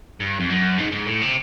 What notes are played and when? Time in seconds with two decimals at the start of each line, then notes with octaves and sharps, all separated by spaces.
0.20 G2
0.40 F2
0.50 F#2
0.78 G#2
0.91 G#2
1.06 A2
1.21 C3